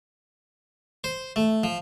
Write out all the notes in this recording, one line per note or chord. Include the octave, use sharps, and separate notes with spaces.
C5
A3
F3